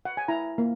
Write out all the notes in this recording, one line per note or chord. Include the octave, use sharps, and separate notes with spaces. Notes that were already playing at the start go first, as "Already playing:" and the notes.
F#5
G#5
E4 A#5
A#3